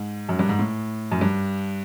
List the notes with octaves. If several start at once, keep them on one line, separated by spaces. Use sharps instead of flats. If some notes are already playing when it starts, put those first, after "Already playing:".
Already playing: G#2
F#2
G2
G#2
A2
F#2
G2